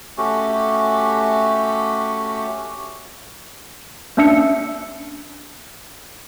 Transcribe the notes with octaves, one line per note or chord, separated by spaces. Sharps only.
A3 C#4 F#4 G4
A#3 C#4 D4 E5 E6 C#7